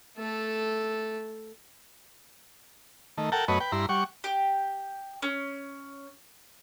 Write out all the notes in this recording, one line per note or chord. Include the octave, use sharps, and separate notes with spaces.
A3 A4
D#3 A3
A4 A#4 F#5 G5 A5
F#2 A3 B3 B4 C#5 D#5
B4 G5
G2 E4 A#5 C6
G3 F#5 C#6
G4
C#4